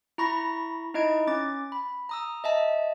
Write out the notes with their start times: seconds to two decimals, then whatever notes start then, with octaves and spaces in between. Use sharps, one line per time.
0.18 E4 A#5 B5 C#6 A#6
0.94 D#4 E4 D#5 G#6 D7
1.27 C#4 D6 A6
1.72 B5
2.09 A#5 D#6 E6
2.44 D#5 E5 A5